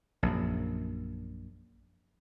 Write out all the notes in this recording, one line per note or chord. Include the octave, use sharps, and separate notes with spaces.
A#1 F#2